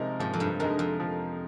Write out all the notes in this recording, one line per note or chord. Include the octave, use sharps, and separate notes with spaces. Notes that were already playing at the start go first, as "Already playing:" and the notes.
Already playing: C3 F3 G#3 D#4 A#4
G#2 F3
F2
G2
F2 G#3 D#4 A#4
F2
F3